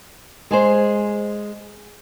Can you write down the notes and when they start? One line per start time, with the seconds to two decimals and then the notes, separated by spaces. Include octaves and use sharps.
0.51 G#3 G#4 C5